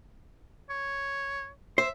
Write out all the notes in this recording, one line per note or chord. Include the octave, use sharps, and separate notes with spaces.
C#5
C5 E5